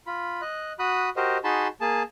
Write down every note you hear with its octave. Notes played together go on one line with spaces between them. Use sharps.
F4 B5
D#5 F#6
F#4 B5 D#6 F#6
F#4 G4 A#4 C5 D#5
D#4 F#4 G#4 A5 B5 C6
A#3 G#4 A5